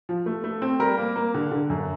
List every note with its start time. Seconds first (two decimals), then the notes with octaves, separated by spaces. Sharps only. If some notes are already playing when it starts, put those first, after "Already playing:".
0.09 F3
0.26 A3
0.44 A3
0.62 C4
0.79 G3 A#4
0.97 A#3
1.16 A#3
1.34 D3
1.52 D3
1.70 F#2